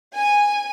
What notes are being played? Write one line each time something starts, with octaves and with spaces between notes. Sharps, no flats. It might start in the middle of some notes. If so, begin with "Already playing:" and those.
G#5